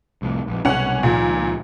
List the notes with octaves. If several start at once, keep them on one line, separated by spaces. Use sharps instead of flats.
C2 F2 A2
A#1 F2
C2 F#2 B2 C#4 F#5
C#2 A#2 D#3 F3